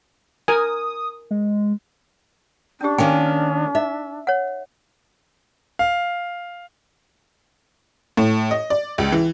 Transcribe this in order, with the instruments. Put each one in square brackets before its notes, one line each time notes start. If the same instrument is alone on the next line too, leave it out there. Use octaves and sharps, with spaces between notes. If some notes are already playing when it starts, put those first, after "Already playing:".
[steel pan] A#4 G#5 [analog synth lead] D#6
[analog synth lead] G#3
[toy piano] C#4 G4 [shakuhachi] D4
[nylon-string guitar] D#3 A#3 C#4 [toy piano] G5 G#5
[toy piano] D#4 [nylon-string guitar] E5
[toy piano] C#5 F#5
[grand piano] F5
[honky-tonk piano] A2
D#5
D5
C#2
E3